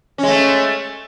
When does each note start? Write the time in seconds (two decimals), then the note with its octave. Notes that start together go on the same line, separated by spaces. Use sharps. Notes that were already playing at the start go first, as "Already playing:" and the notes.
0.18 C#4
0.23 G#3
0.28 A3